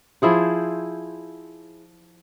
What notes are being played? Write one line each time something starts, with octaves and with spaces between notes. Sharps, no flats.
F3 E4 G#4 C5